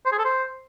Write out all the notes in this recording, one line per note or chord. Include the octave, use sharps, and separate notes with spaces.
C5
G#4
A4
C5